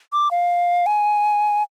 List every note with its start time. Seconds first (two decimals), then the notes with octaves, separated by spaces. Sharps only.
0.13 D6
0.31 F5
0.86 G#5